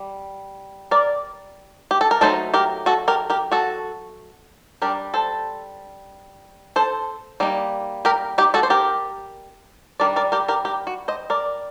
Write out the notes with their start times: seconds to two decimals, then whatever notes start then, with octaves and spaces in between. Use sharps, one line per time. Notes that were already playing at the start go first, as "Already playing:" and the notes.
Already playing: G3
0.91 A#4 D5
1.91 G4
2.01 A4
2.11 A#4
2.21 F#3 A3 D#4 A4 C5
2.54 G4 A#4
2.86 F#4 A4
3.08 G4 A#4
3.30 G4 A#4
3.52 F#4 A4
4.82 G3 D4 G4 A#4
5.14 A4 C5
6.76 A4 C5
7.40 G3 A#3 D#4
8.05 G4 A#4
8.38 D#4 G4
8.54 F#4 A4
8.63 C5
8.70 G4 A#4
10.00 D#3 G3 D4 A#4 D5
10.16 A#4 D5
10.32 G4 A#4
10.48 G4 A#4
10.65 G4 A#4
10.87 F#4
11.08 C5 D#5
11.30 A#4 D5